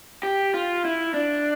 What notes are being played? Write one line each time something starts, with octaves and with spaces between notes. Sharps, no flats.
G4
F4
E4
D4